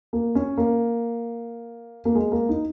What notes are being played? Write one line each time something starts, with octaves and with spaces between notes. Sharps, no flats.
A#3
C#4
A#3
A#3
G#3
A#3
D#4